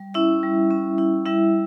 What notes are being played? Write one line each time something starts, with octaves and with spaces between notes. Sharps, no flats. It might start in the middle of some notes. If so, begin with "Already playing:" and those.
Already playing: G3
C#4 E4 E5
G3
C#4
E4
G3 E4 E5